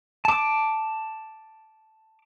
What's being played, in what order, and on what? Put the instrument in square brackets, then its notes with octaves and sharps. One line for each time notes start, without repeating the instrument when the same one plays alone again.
[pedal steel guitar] A5 D6